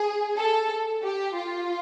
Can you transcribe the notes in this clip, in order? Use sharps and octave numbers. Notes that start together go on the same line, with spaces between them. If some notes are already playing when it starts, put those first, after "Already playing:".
Already playing: G#4
A4
G4
F4